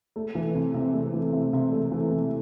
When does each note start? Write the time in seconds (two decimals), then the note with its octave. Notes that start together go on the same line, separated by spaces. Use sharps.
0.16 A3
0.35 E3
0.55 C3
0.74 C3
0.94 A3
1.14 E3
1.33 C3
1.53 C3
1.72 A3
1.92 E3
2.11 C3